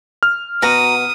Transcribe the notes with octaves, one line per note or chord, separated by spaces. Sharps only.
F6
B2 F#4 A#5 D#6